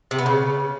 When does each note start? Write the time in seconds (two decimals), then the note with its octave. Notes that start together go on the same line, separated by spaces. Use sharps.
0.11 C3
0.18 B3
0.26 C#3